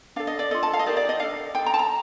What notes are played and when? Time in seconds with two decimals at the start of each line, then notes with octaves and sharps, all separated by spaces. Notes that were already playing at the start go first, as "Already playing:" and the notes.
0.16 D4 A4 F5
0.27 D#5
0.39 D5
0.51 F4 A4 D#5
0.63 A5
0.73 F5
0.79 D#5
0.86 D#4 G4 A#4 D5
0.97 D5
1.09 D#5
1.20 D4 A4 F5
1.55 D#4 A4 G5
1.66 A#5
1.74 A5
1.79 A#5